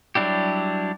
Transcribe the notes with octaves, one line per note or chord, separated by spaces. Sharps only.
F#3 G3 D4 E4 G4